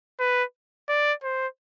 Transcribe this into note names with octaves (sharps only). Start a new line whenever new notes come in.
B4
D5
C5